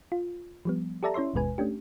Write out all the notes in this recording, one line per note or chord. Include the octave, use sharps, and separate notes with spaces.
F4
F3 G3 B3
G4 A4 D5 E5 A5 A#5
C#4 E4 C#5 E5 C6
G1 D#2 B2 G#3 B4 G#5
A3 C#4 D4 G4